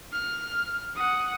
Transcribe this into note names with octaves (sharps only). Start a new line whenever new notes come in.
F6
F#5 D#6